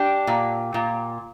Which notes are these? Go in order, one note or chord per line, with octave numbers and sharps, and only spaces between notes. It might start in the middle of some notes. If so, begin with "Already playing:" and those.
Already playing: D4 G4
A#2
A#2